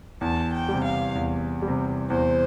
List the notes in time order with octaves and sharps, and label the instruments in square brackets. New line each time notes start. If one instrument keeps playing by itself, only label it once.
[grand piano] E2 [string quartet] A5
[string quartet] G5
[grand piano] C3 G3
[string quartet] F5
[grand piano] E2
G3
C3
[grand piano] E2 [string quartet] C5